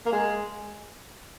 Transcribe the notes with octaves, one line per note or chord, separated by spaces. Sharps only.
A#3
G#3